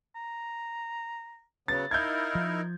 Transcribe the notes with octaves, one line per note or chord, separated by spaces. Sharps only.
A#5
C#3 F#3 B3 A6
D#4 E4 A#4 F5 G6 G#6
F3